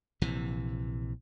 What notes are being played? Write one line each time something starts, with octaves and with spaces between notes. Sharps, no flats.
A#1 C3 E3